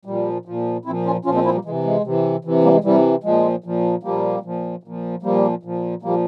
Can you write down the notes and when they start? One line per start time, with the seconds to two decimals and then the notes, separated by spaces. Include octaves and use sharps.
0.05 A#2 F3 G3
0.45 A#2 F3
0.85 A#2 C4 E4
0.89 F3
1.06 C#4 F4
1.25 A#2 F3 C#4 F4
1.35 G#3 C4
1.45 C4 E4
1.54 G3 A#3
1.65 C3 E3 G#3
1.84 G#3
2.04 C3 E3
2.45 C3 E3
2.64 G3 A#3
2.74 G#3
2.84 C3 E3 G3
3.24 A#2 F3 G#3
3.64 A#2 F3
4.03 A#2 F3 G3 A#3
4.43 A#2 F3
4.83 A#2 F3
5.22 A#2 F3 G3 A#3
5.63 A#2 F3
6.02 A#2 F3 G3 A#3